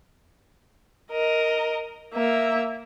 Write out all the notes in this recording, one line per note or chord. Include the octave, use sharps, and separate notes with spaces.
A#4 D#5
A#3 E5